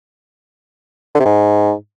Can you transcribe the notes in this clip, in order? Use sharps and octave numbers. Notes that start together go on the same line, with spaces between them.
D3
C3
G#2